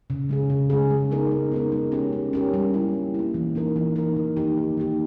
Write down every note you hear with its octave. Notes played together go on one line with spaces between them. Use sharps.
C#3
G#3 C#4 G#4
C#3
G#3 C#4 G#4
G#3
B3 D#4 A#4
G#3
B3 D#4 A#4
G#3
C#4 G4 A#4
G#3
C#4 G4 A#4
G3
A#3 E4
G3
A#3 E4
E3
A#3 D#4 A#4
E3
A#3 D#4 A#4
D#3
A#3 D#4 G4
D#3
A#3 D#4 G4